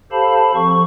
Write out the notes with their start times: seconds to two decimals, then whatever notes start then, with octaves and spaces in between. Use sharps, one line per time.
0.12 G4 A4 C5 F5 A5 B5
0.55 F3 C4 A4 C#6